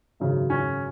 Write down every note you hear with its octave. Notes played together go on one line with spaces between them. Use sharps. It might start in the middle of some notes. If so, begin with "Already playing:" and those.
G#1 F#2 C#3 F#3
C#4